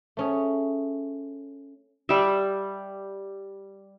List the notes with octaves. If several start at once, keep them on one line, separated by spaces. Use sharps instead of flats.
A3 C#4 G#4
G3 E5